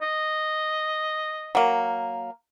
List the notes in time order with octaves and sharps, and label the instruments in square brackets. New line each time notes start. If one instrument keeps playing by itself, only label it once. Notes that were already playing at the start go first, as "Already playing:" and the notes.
[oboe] D#5
[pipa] F#3 A#3